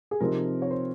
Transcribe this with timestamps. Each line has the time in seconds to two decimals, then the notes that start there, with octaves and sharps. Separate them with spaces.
0.11 G#4
0.20 C3 F3 C4 D#4 A#4
0.62 C#5
0.71 C5